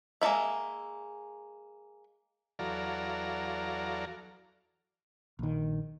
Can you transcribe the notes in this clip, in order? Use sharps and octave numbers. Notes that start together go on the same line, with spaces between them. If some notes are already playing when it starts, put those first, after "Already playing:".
G#3 A#3 D#4 E4 E5
E2 F#3 A4 D5 F5 A#5
A#1 D#3